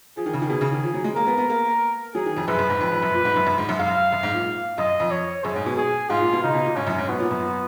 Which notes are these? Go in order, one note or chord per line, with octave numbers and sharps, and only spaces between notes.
F3 G#4
D#3
C#3
D#3
B2 G#4
C#3
D#3
F3
F#3
G#3
A#3 A#4
B3
B3
A#3
F#3 G#4
D#3
F2
F#2 B4
F#2
G#2
F2
F2
F#2
A#2
G#2
F#2
F#2
G#2
F#2
F#2 F5
F#2
G#2
A#2
F#2 D#5
F2
C#5
F#2 G#4
G#2
B2
G#4
G#2 F4
A#2
B2
C#3 D#4
B2
A#2
G#2 C#4
F#2
G#2
B2 B3
A#2
F#2